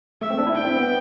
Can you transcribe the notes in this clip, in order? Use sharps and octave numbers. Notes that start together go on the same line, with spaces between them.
A3 E5
C4
D4
E4
D4 G5
C4
B3